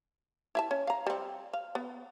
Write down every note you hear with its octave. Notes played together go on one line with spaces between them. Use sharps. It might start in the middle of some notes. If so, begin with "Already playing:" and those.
E4 E5 A5
C#4
F5 A#5
G3 C4
F5
B3